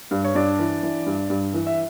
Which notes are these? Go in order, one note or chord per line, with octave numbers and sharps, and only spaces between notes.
G2
C#5
G2 D4 D5
E3
E3
G2
G2
E3
E5